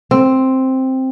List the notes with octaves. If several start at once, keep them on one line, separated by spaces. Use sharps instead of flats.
C4